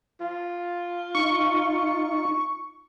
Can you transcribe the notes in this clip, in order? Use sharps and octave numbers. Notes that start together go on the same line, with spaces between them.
F4
D#4 C#6